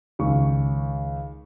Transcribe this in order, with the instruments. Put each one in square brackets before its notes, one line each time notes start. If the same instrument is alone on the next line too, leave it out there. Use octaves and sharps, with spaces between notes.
[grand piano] C#2 D#3 C#6